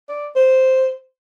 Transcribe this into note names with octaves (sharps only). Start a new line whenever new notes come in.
D5
C5